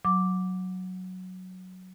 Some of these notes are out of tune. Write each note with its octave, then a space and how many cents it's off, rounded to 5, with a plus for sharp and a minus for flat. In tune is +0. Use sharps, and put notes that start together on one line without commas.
F#3 +0 D6 +0